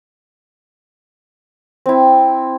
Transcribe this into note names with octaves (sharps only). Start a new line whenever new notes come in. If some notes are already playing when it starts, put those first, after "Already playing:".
C4 E4